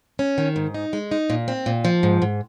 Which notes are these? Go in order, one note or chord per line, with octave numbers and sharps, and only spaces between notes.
C#4
D#3
G#2
D#4
G#3
D#4
A#2
C4
A#2
F3
G#2
G#2